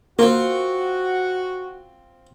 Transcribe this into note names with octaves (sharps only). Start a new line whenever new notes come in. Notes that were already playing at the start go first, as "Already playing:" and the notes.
A#3 C4 F4 F#4